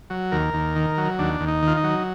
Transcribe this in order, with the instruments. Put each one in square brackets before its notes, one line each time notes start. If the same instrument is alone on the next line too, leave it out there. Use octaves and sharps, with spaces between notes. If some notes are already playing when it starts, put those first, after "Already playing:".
[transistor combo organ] F#3
D#2 A#4
D#2
D#3
F#3
D#2 D4
D#2
D#4
D#3 F4
D#4
F#3